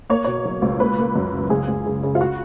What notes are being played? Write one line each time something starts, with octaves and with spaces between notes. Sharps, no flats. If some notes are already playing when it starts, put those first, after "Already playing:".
A#3 C#5
B2 C#5
F#3
C#2
A#3 B4
A#3
F#2
F#1
C#2 G#4
C#2
C#3
C#3
F4
F#4